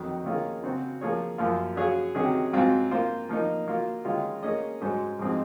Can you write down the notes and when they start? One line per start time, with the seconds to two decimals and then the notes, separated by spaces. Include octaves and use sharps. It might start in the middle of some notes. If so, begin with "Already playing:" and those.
Already playing: F2 D#3 F#3
0.24 D#3 A#3 C#4 F4 G#4
0.62 C#3 F#3 C4 F#4 C5
1.01 F3 A#3 F4 G#4 C#5
1.38 F#2 F3 A#3 F4
1.76 F#3 C#4 G#4 C#5 F5
2.15 C3 D#3 F#3 C#4 G#4
2.53 G#2 F#3 C4 F4
2.91 A#3 F4 C5
3.29 F3 A#3 D#4
3.67 F#3 A#3 F4
4.05 D#3 G#3 C#4 F4
4.43 A#3 C#4 G#4 D#5
4.81 G#2 F#3 C#4 G#4 C5
5.19 G#2 F3 G#3 C4 D#4